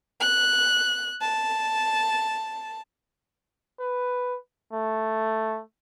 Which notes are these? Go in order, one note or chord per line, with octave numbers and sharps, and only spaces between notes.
F#6
A5
B4
A3